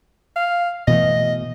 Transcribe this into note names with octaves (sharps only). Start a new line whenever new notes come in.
F5
B2 E3 A3 D#5